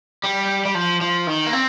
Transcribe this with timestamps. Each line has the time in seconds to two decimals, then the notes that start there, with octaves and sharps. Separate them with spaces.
0.24 G3
0.65 G3
0.75 F3
1.01 F3
1.27 D#3
1.47 A#3
1.53 C4